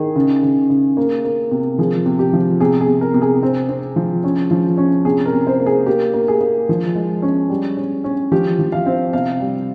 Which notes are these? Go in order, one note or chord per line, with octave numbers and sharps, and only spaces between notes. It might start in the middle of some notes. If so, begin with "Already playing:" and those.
Already playing: D#3 G#4
C#3
C#3
C#3
A#3
A#3
C3
F3 G#4
C3
G4
F3
C3 G#4
G#4
C3
A#4
C3
G#4
C4
C4
F3
C#4
F3
C#4
C3 G#4
A#4
C3
C5
A#3
G#4
A#3 G4
A#3
G#4
A#3
F3
G#3
C#4
G3
C#4
C#4
F3 G4
F3
F5
C4
C3 F5
G3